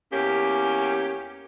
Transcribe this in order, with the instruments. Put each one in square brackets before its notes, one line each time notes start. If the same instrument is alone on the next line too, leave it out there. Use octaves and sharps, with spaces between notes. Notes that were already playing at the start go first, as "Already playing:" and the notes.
[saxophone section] E2 A#3 G4 [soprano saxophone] C#4